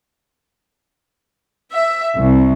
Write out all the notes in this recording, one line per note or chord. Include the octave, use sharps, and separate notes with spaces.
E5
C2